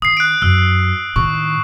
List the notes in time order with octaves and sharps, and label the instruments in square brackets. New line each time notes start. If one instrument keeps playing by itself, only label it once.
[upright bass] D#3 [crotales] D#6 C7
[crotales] F#6 D7
[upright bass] F#2 [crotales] E6 F#6
[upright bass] A2 D#3 [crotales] C#6